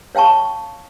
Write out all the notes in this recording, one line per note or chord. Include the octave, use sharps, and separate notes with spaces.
C#5 F5 G5 A5 C#6